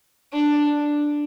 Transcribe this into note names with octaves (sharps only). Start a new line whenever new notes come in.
D4